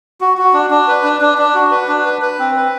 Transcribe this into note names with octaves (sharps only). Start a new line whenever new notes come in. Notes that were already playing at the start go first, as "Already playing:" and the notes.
F#4
F#4
D4
D4
B4
D4
D4
D4
F#4
B4
D4
B4
B4
C4
B4